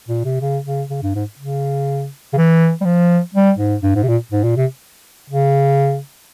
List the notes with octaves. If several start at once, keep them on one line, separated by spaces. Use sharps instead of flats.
A#2
C3
C#3
C#3
C#3
G2
G#2
C#3
C#3
E3
G3
F3
G3
G#2
G2
G#2
C3
A#2
G#2
A#2
C3
C#3